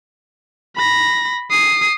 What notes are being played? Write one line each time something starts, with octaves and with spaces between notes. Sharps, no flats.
B5 A#6
D#6 C7